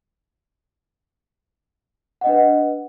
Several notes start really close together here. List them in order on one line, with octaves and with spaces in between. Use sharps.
F#5 D#5 D4 B4